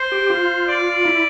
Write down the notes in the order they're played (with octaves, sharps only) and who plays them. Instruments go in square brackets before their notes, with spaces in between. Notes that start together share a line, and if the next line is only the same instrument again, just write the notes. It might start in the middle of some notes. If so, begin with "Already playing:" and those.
Already playing: [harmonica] C5
[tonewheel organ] G4
F4
[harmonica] D5
[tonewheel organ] E4